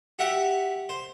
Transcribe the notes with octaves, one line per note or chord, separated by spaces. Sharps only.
F#4 G4 E5 F#5
C5